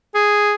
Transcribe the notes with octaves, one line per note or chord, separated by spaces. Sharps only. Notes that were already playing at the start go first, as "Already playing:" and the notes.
G#4